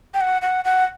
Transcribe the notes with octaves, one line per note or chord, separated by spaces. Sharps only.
G5
F#5
F#5
F#5